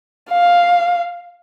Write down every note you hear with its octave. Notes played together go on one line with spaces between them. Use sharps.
F5